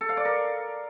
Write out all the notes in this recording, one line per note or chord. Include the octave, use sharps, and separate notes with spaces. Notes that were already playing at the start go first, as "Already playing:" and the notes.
A4
F5
D5
A#4